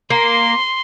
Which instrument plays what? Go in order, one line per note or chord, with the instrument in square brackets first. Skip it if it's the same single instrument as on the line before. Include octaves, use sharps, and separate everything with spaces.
[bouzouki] A#3 [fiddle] C6